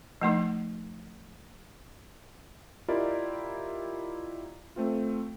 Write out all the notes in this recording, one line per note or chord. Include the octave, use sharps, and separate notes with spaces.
F3 A3 D#4
E4 F4 G4 A#4 D5 D#5
A3 C4 F4